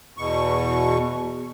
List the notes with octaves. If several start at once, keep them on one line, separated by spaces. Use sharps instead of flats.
E2 B2 C#6